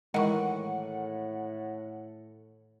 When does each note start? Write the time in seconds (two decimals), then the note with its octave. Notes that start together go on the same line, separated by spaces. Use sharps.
0.14 A2 D#3 E3 G#3 F#5 C#6